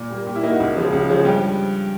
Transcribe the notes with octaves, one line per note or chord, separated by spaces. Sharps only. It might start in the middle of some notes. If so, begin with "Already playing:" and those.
Already playing: A#2
G3 A#3
A#2 G4
E4
G3 A#3 D#4
F#4
C#2
C#3 F3 G#3
C#2
C#3 F3 G#3
G2 G4